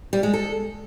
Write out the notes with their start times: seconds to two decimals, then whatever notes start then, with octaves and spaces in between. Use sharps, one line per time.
0.13 G3
0.23 G#3
0.34 A4